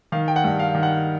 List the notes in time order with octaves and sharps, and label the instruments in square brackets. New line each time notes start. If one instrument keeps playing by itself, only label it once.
[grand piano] D#3 F5
G5
F#5
G2
F5
D#3
F#5